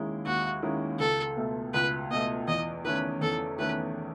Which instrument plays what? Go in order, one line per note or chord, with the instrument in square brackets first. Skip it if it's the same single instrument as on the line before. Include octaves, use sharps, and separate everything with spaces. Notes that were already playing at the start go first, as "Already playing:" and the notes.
Already playing: [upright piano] D#2 D#3 G#3 C#4 E4
[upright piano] D#2 [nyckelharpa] F#4
[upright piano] D#3 G#3 C#4 E4
[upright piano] C#2 [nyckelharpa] A4
[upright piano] B2 A3
[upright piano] C#2 [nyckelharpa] B4
[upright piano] B2 A3 [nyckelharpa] D#5
[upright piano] E2 [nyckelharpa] D#5
[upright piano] D#3 A3 C#4 [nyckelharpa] B4
[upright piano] E2 [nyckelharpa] A4
[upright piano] D#3 A3 C#4 [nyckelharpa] B4